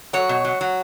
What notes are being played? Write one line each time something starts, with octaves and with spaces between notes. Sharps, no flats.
F#3 C#5
B2
F#3
F#3